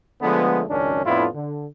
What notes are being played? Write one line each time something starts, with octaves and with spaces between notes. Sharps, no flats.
D3 F3 G#3 A3 B3
G#1 C#2 F#2 D#3 C#4 D4
F2 A2 B3 D4 E4 F4
D3